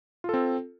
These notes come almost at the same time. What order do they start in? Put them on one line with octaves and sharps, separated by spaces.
F4 A4 C4